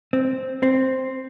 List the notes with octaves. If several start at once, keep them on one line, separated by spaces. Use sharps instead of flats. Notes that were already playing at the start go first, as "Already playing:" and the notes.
C4
C4